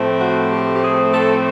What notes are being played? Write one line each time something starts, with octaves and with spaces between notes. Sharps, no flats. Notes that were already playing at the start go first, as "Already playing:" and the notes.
Already playing: A2 F3 A3 C4
F#4
G4
G4
G#4
A4